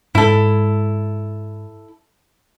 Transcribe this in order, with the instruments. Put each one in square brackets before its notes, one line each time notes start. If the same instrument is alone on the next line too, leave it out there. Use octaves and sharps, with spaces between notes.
[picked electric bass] G#2 G#3 [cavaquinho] E4 A4